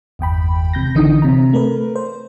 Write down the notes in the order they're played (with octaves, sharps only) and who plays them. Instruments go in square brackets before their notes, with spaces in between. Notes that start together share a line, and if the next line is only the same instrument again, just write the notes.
[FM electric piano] G1 E2 G5 B5
C#2 C3 G6 A#6
A1 D3 E3 D#4 D#6
C3 A#5
A3 A#4 B4
C5